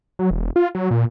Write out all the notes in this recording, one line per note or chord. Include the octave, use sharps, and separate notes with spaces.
F#3
E1
F4
F#3
A#2